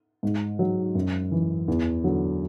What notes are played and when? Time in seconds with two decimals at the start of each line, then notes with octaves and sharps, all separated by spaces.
0.23 G#2
0.59 F#3
0.95 F#2
1.32 E3
1.68 E2
2.04 D3 F#3